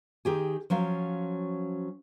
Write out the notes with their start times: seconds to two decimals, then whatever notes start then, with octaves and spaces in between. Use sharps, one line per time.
0.25 D#3 G4 G#4
0.70 F3 F#3 C#4 F5